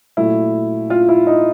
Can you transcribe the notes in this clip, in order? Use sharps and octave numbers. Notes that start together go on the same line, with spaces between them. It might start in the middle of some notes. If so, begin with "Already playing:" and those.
A#2 F#3 A3 E4
F4
E4
D#4